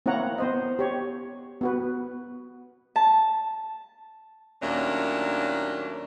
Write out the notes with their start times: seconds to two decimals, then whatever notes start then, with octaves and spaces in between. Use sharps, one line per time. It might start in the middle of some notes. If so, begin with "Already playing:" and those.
0.06 A#3 C4 E4 C#5 F#5 A#5
0.38 B3 C5 D#5
0.79 G4 C#5
1.61 B3 F#4 B4
2.96 A5
4.62 D#2 A#2 F#3 A3 C#4 D4